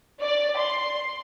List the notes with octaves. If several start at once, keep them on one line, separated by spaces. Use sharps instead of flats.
D5
C6